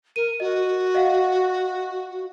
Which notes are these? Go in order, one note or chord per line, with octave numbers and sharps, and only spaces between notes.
A#4 D#7
F#4 D#5
D#5 F5 F#5